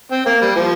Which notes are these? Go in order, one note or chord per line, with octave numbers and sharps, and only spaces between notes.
C4
A#3
G3
F3